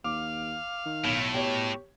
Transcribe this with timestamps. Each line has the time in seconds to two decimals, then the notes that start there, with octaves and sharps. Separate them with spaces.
0.04 D#2 F5 D6
0.86 D#3
1.04 B1 A2
1.34 B2 G4 C#5